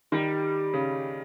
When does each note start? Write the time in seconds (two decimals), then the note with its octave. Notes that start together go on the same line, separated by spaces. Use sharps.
0.12 D#3 G3
0.74 C#3